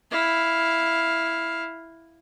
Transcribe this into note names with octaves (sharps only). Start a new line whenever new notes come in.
E4 F5